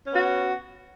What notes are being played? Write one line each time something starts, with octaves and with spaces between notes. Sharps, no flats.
B3 C#4 F#4